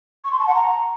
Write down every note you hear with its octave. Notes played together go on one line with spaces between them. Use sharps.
C#6
C6
A5
F#5
A#5